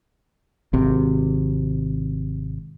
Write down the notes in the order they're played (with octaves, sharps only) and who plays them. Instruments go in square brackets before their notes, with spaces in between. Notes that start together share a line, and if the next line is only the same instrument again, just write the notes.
[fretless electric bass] G#1 C3